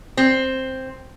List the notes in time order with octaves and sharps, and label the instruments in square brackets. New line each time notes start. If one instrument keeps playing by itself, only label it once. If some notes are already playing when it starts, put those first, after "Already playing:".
[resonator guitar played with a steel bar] C4